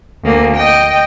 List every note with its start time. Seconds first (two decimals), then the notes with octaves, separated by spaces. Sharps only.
0.24 D2 A#3
0.56 D#5 G5